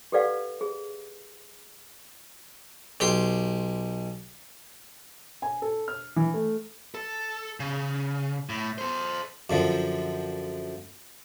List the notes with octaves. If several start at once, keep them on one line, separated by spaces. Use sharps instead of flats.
G4 A4 B4 D5 F5 F#5
G#4
B1 G4 C6
G#5
A4
F6
E3
A3
A4
C#3
A2
A4 C5
F#2 D3 F3